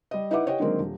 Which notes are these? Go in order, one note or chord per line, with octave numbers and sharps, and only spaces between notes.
G3 D#5
D#4 E4 B4 E5 F#5 D6
G4 C#5 D#5 F#5 G5
D3 D#3 F#3 G#3 A#3 C4
D#1